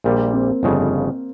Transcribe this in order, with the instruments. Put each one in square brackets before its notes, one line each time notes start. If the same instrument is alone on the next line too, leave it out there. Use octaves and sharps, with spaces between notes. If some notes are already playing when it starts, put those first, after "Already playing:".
[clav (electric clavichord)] A#1 A#2 G3 [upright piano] A#3
[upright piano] C4
[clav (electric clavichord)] G1 F2 C#3